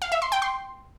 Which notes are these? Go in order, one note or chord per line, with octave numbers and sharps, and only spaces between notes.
F5
E5
C6
G5
C6